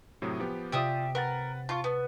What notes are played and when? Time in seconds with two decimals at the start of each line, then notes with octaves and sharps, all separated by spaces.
0.22 A2 C3 F#3 G#5 D#6
0.40 F3 B3 G4
0.72 C3 F4 G4 D5 E5 D#6 D7
1.15 A#4 B4 F#5 A6
1.69 F4 A5 C#6
1.84 B3